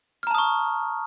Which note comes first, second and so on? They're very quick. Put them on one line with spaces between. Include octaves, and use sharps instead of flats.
F6 A#5 A5 D#6 C#6